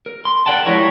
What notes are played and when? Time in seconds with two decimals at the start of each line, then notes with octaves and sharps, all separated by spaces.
0.06 A#4
0.25 C6
0.46 A#4 D5 F#5 G5 A5
0.66 F3 G3 G#3 E4 A#4 C#5